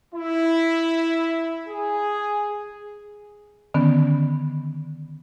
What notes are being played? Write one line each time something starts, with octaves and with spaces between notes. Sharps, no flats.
E4
G#4
D3 D#3 B3 C#4